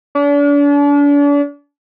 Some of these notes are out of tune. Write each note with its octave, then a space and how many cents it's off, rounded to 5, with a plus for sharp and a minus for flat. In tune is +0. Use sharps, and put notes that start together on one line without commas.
D4 -40